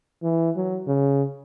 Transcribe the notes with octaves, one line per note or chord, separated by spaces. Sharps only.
E3
F#3
C#3